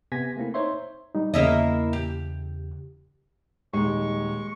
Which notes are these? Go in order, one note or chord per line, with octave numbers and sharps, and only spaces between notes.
C3 B3 G#5 G#6 A#6 B6
A3 A#3 C4 E4
D#4 C5 C#5 E5 C6
G3 D#4
E2 C#3 A#3 E4 D#5
G4
D#1 G#3 D#4 C#6